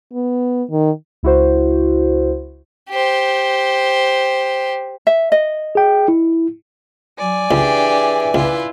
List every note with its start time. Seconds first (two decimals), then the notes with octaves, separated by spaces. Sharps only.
0.14 B3
0.70 D#3
1.23 C#2 E4 F#4 C5
2.90 G4 C5
5.07 E5
5.32 D#5
5.75 G#4 G5
6.08 E4
7.18 F#3 D5 G#5
7.51 C#2 E3 D4 G4 G#4
8.34 C#2 E4 F4 B4